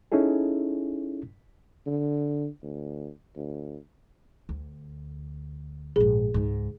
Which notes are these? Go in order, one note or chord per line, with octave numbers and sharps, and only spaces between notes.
C#4 D#4 E4 G#4 A4
D3
D2
D2
D2
A#1 G#2 G#4
C#2 G#2